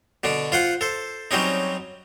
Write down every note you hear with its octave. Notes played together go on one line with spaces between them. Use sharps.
B2 D3 D4
F4 C5 F#5
A4 C5
F#3 G3 C4 C#4 D#4